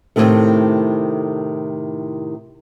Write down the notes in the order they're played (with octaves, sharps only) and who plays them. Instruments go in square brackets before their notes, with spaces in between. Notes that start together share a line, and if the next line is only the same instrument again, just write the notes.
[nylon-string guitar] A2 C3 D#3 A3